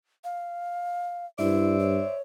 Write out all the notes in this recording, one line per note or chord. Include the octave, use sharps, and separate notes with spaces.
F5
G2 E4 C5 D5 E5
C#5